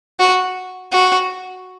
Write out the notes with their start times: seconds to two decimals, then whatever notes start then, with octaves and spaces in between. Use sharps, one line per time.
0.20 F#4
0.92 F#4